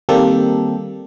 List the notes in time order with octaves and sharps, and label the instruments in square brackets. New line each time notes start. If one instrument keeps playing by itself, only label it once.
[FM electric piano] D#3 G3 A#3 C4 G4 A4